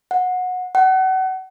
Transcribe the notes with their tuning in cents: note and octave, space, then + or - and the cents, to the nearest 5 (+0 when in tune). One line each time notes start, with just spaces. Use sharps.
F#5 -20
F#5 +30